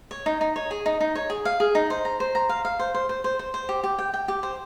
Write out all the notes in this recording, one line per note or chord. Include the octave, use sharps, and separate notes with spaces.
C#5
D#4
D#4
C#5
G#4
D#4
D#4
C#5
G#4
F5
G#4
D#4
C5
A#5
C5
A#5
F5
F5
C5
C5
C5
C5
C5
C5
G4
G4
G5
G5
G4
C5